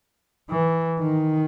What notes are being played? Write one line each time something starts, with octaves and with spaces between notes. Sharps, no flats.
E3
D#3